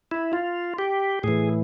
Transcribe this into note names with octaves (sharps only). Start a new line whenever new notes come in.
E4
F4
G4
A2 E3 G#4